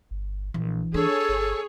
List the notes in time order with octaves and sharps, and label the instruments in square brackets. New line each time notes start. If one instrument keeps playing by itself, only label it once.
[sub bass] G1
[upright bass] A#1 [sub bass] E3
[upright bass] D4 [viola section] G#4 C#5 [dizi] A4
[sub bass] G1